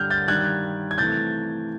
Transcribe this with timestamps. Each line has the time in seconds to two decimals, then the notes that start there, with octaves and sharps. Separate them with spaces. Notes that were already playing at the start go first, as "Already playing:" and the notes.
Already playing: G2 D3 G3 F6 G6
0.10 G6 A6
0.28 G2 D#3 G3 F#6 G#6
0.91 G#6
0.98 C3 E3 A3 G6 A6